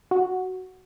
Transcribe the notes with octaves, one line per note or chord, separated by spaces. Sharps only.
F#4